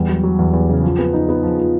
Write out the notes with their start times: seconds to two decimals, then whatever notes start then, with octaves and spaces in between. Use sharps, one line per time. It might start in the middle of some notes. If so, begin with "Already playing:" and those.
Already playing: E2 G3
0.09 F#3
0.23 F#3
0.39 E2
0.53 E2
0.69 C#3
0.83 F3
0.99 B3
1.14 D#4
1.29 B3
1.43 F3
1.58 F3